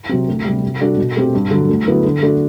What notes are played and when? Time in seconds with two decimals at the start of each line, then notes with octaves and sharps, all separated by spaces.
0.09 C3 F#3 C4
0.28 D2
0.45 C3 G3
0.63 C3
0.81 G3 D4 F#4 A4
0.98 B2
1.16 A3 C4 G4
1.34 G2
1.51 D3 F#3
1.68 D2
1.87 D3 F#3 B3 E4
2.04 D3
2.22 A3 D4 F#4 A4